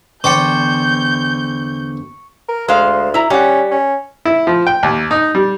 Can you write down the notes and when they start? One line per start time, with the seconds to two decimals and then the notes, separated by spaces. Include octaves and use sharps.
0.24 E2 D3 C5 D5 G5 C#6 G6 C#7
2.49 A#4
2.68 D2 G#3 C5 F5
3.14 E4 A#5
3.30 G3 C#4 F#5
3.71 C#4
4.25 E4
4.47 F3
4.67 G5
4.83 D#2
5.11 D#4
5.35 G3